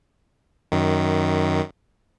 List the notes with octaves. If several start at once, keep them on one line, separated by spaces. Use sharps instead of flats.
F#2 D#3